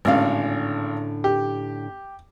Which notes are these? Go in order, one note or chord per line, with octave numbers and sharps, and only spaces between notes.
G#1 A2 D3 C#4 F5
G4